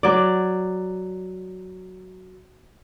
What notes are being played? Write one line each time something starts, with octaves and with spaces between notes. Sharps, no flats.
F#3 D5